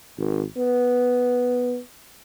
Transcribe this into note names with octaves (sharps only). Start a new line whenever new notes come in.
G#1
B3